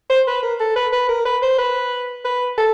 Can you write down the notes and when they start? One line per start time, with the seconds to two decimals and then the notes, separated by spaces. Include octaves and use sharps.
0.10 C5
0.27 B4
0.43 A#4
0.60 A4
0.76 B4
0.93 B4
1.09 A#4
1.25 B4
1.42 C5
1.59 B4
2.25 B4
2.58 A4